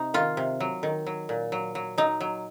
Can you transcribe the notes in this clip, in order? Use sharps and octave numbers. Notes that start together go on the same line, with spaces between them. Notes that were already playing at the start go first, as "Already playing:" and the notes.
Already playing: C3 D#4
D#3 F4
C3
F#3
D#3
F#3
A#2
F#3
F#3
F#3 D#4
F#3